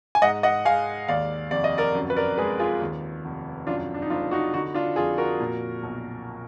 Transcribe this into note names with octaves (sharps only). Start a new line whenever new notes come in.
G#5
G#2 D#5 F#5
D#5 F#5
G#3 F5 G#5
D#2 D5 F5
F1 D5
D#5
A#4 D5
F#2
B4
A#4 D5
G#3 G#4 B4
F4 G#4
D#2
F1
F#2 D4 F4
D4
D#4
F#1 D4 F4
D#4 F#4
D3 D#4 F#4
D4 F4
F2 F4 G#4
F#4 A#4
A#2
B1